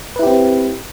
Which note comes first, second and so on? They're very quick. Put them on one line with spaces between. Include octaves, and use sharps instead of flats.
B4 E4 G4 C4